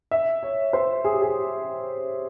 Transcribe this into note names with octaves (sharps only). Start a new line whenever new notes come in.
E5
C#5
C5
G#4
G4
G#4